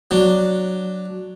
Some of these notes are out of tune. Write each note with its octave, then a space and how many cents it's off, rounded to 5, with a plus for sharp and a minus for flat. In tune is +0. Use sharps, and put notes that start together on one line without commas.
F#3 +0 D4 +0